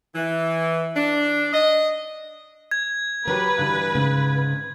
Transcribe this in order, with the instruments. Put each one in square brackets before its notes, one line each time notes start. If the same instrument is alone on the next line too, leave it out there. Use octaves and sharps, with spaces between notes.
[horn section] E3
D4
D#5
[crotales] G#6
[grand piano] F#3 G4 B5 [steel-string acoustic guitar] A#4 [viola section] B4
[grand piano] G2 D3 E3
[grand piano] G#2 [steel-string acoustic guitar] C#3